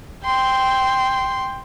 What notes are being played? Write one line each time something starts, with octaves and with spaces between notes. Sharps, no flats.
G5 C6